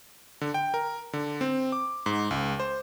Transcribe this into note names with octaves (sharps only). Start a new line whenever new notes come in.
D3
G5
A#4
D3
C4
D6
G#2
C#2
C5